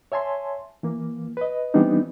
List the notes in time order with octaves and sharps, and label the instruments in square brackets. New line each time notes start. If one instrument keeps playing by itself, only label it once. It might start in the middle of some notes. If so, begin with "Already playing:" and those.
[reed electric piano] C#5 E5 G#5 A5 C6
E3 A#3
B4 D#5
E3 G3 B3 C4 D4 D#4